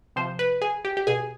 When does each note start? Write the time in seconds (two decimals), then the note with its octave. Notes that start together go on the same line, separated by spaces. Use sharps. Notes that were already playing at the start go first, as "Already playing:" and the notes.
0.16 C3 F3 C5
0.39 B4
0.62 G#4
0.85 G4
0.97 G4
1.07 B2 G#4